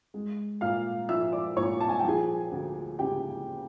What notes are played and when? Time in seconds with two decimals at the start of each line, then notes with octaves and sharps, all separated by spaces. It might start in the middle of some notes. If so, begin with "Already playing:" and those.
0.14 G#3
0.61 A#2 F5 F6
1.09 F3 E5 E6
1.33 D5 D6
1.57 A#2 C#5 C#6
1.80 A5
1.89 G#5
1.99 G5
2.04 F3 G#4 G#5
2.52 D2
2.99 C#3 G4 G5